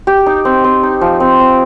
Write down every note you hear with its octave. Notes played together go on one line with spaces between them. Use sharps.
G4
D#4
C4
C4
D#4
F3
C4
C4